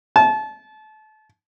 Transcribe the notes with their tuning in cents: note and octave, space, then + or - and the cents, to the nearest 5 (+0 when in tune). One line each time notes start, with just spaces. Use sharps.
A5 -30